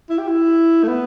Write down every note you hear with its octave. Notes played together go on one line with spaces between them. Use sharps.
E4
G4
E4
A3
B3